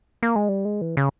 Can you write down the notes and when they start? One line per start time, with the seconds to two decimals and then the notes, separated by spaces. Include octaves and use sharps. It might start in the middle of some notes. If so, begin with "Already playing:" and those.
0.23 A#3
0.36 G#3
0.49 G3
0.65 G#3
0.81 E3
0.97 C#3